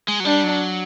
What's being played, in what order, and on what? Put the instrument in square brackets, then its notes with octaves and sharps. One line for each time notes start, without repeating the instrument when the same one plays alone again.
[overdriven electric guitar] G#3
F#3
[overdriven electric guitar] G3 [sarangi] D4
[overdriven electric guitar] F#3